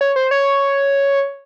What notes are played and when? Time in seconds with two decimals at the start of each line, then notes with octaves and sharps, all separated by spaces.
0.01 C#5
0.16 C5
0.31 C#5